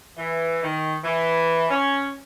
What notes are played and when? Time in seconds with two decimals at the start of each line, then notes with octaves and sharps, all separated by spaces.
0.17 E3
0.63 D#3
1.04 E3
1.70 C#4